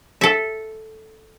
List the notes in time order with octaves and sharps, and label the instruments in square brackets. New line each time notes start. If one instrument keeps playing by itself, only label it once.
[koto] A4 E5